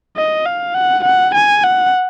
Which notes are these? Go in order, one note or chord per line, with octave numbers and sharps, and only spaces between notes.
D#5
F5
F#5
F#5
G#5
F#5